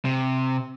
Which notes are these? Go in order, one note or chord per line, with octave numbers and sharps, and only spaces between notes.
C3